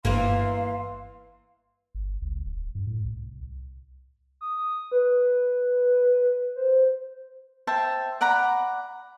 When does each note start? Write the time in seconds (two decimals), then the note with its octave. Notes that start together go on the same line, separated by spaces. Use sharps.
0.05 G1 E3 A#3 F5 C6
1.95 G1
2.22 C#2
2.46 D#1
2.75 G2
2.87 A2
3.05 C2
4.41 D#6
4.92 B4
6.56 C5
7.67 C5 E5 G5 A5
8.21 D5 F#5 A#5 B5